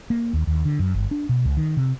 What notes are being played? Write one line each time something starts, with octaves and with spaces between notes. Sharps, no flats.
A#3
D#2
D#2
D3
F#2
G1
D4
B2
C#2
D#3
C3